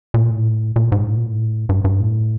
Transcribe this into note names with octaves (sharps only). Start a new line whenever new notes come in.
A#2
A2
A#2
G#2
A2
A#2
A2
G2
G2
A2